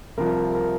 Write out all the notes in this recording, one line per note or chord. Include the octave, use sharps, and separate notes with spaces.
C2 C3 F3 A#4
A#4